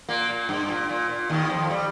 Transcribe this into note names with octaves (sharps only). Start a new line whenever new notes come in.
A#2 A#3
A#2
G2
A#2
A#2
A#2
D#2 D#3
F2 F3
G3